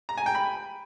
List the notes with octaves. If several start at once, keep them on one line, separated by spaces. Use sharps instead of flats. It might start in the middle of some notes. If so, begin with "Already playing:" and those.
A#5
G#5
G5
B5